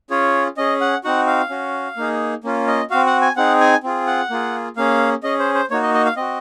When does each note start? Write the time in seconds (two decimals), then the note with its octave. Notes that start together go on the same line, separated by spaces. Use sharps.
0.10 C#4 F4 G#4 C#5
0.57 C#4 G#4 D#5
0.81 F#5
1.04 C4 D#4 F#4 F#5
1.27 F5
1.50 C#4 F#4
1.97 A#3 D#4 G#4
2.44 A#3 C#4 F4
2.67 D#5
2.91 C4 F#4 F5
3.06 F#5
3.22 G#5
3.37 C4 D#4 G#4 F#5
3.60 G#5
3.84 C4 F4 G#4
4.07 F#5
4.30 A#3 F4 G#4
4.77 A#3 C#4 G#4 F5
5.23 C#4 G#4 D#5
5.39 C5
5.55 C5
5.71 A#3 D#4 F#4 C#5
5.83 D#5
5.94 D#5
6.06 F5
6.16 C4 F#4 D#5